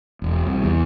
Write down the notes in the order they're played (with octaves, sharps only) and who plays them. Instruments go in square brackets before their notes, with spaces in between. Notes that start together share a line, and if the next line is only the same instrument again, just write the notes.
[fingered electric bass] E1
C2
E2